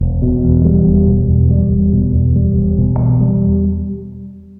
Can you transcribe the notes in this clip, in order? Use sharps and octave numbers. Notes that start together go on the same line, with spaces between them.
E1
B2
E2
G3
E1
B2
E2
G3
E1
B2
E2
G3
E1
B2
E2
G3